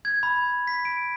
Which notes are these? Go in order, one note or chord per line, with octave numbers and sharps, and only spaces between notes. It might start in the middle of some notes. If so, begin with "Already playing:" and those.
G#6
B5
B6
D7